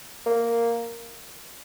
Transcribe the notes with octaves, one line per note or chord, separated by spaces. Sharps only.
A#3